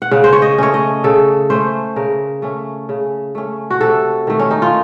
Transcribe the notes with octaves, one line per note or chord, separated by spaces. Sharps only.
F#5
C#3 F5
C5
C#5
D#5
A3 C#4 C#5
D#5
C#3 A4
A3 C#4 C5
C#3 A#4
A3 C#4
C#3
A3 C#4
F#4
C3 A4
D#3 A3
C#4
D#4
F4